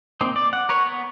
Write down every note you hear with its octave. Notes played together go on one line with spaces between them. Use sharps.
A#3 C4 D#4
D5
F#5
A#4 B4 C#5
B3